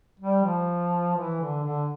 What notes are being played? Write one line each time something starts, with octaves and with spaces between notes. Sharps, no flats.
G3
F3
E3
D3
D3